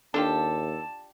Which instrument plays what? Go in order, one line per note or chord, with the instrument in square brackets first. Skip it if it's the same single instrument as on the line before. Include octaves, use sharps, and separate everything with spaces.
[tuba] D#2 [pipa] D4 F4 G4 [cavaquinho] A4 [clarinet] A5